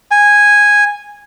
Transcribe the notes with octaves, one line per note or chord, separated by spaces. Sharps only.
G#5